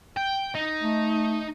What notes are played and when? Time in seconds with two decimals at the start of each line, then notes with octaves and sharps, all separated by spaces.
0.17 G5
0.55 D#4
0.83 A3